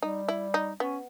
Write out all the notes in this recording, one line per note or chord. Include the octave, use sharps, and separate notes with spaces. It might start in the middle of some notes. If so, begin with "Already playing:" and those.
G3 D#4
E4
D#4
B3 C#4